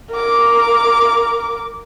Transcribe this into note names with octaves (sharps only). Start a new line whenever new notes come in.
A#4 D6